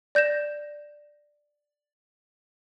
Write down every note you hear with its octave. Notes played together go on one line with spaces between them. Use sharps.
D5 G6 A#6 E7